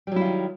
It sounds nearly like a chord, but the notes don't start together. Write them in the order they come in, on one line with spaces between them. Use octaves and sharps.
G3 F#3 E4 F4 D#3